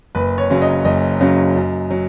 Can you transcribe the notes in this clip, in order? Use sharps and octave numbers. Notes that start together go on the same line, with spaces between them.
F#1 B4
C#5
F#2 C#3 F#3
D#5
F#1 D#5
F#2 C#3 F#3
F#2
F#3